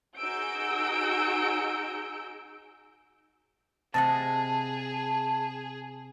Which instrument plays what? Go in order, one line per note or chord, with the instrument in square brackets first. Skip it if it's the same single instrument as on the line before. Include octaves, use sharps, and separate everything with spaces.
[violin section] D#4 F#4 G#4 E6 G6 D7
[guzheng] C3 D#5 F#5 [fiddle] G#4 [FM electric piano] A5